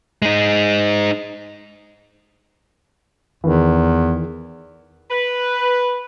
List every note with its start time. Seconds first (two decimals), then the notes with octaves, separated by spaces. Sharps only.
0.22 G#3 D#4
3.44 E2 D#3 E3
5.10 B4